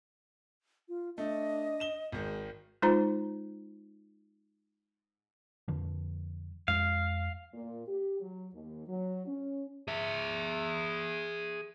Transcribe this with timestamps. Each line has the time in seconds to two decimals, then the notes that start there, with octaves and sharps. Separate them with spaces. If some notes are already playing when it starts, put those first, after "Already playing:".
0.88 F4
1.18 A3 D4 D#5
1.80 E7 G7
2.12 G#1 D#3 G#3
2.82 G#3 D#4 F4 C5 A#5
5.68 F2 D3 F3
6.68 F2 G#3 F5
7.54 A#2
7.87 G4
8.20 F#3
8.53 D#2
8.88 F#3
9.27 C#4
9.88 G#4 E5